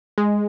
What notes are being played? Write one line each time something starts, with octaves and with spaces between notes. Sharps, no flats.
G#3